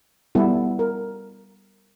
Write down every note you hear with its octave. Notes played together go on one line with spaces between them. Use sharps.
G3 B3 E4 A4
A#4